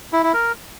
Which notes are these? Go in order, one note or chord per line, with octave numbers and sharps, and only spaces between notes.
E4
E4
A#4